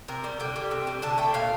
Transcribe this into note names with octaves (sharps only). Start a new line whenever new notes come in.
C3 A#4
G3
D3 G5
G3
C3
G3
D3 A5
A3 G5
A#2 F5